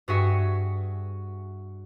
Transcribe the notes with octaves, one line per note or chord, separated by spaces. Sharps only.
G2 F#4 G#4 E5 C#7